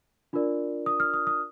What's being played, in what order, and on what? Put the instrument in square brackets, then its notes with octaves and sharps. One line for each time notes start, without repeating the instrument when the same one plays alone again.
[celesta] D4 F4 A#4 D5
D#6
F6
D#6
D#6